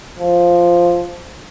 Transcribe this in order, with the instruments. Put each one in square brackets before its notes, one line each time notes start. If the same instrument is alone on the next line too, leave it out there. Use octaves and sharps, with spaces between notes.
[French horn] F3